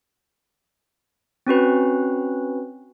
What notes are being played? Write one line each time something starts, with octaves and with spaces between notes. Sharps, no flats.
C4 C#4 F#4 B4